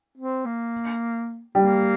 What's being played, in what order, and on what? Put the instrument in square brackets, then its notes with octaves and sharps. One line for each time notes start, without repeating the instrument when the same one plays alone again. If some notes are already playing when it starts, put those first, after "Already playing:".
[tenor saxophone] C4
A#3
[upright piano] G3 [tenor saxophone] A#3